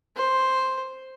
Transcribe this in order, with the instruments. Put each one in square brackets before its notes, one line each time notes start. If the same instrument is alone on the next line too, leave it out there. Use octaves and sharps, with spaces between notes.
[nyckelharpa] C5